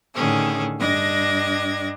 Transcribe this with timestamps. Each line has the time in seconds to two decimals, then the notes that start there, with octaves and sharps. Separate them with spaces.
0.13 A2 D3 D#3 C#4 G#4 A4
0.78 G2 G3 D4 D#5 G#6 A#6